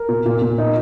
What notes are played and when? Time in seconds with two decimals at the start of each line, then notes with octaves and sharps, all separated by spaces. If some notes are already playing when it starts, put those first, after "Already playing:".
Already playing: A#4
0.09 A#2
0.26 A#2
0.42 A#2
0.58 D#4